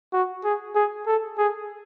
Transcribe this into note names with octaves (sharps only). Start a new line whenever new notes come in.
F#4
G#4
G#4
A4
G#4